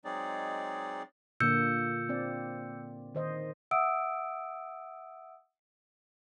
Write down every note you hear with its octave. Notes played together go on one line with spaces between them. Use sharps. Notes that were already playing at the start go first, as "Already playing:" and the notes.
F#3 G#3 C4 D#4 G#4 D5
A#2 D3 A#3 E6 G6 C#7
C4 D5
D#3 C5 D#5
E5 F#5 D#6 E6 D7